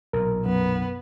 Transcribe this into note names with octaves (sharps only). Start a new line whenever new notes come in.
B1 A#2 A#4
F#2 B3